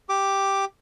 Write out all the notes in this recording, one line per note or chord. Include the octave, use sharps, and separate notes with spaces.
G4 D6